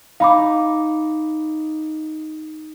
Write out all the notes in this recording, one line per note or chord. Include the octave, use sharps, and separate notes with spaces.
D#4 F5 B5 D6